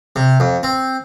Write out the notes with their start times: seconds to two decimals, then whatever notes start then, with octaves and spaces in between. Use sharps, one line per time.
0.16 C3
0.40 F2
0.63 C4